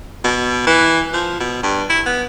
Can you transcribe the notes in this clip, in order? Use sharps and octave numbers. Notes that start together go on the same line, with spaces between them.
B2
E3
F3
B2
G2
E4
B3